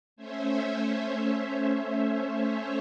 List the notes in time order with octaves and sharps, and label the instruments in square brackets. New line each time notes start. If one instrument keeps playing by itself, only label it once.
[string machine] A3 C#4 C5 C#5 E5